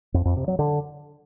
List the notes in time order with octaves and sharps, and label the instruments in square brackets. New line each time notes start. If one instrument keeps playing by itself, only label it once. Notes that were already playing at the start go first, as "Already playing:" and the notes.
[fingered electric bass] F2
F2
C3
F#3
D3